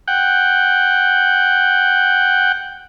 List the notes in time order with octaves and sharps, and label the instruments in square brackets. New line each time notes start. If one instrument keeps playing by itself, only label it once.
[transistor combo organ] F#5 G5